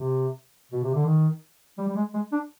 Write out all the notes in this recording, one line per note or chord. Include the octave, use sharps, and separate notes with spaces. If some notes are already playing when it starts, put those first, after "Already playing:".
Already playing: C3
B2
C3
D3
D#3
G3
G3
G#3
G#3
D4